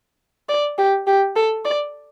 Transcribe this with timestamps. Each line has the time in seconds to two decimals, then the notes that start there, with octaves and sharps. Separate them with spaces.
0.49 D5
0.78 G4
1.07 G4
1.36 A4
1.65 D5